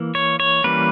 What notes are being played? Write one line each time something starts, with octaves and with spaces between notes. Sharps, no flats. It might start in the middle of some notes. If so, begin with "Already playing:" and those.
Already playing: E3 A#3
C#5
C#5
E3 G3 A#3 C#4 B4